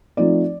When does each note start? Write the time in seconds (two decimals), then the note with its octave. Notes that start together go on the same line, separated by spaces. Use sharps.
0.17 F3 A3 C4 D#4 D5